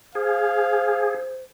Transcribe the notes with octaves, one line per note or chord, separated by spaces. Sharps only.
G#4 C5 F5